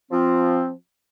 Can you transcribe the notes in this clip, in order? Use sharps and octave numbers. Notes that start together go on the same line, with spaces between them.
F3 C4